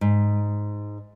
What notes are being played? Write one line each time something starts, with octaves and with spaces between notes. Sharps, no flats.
G#2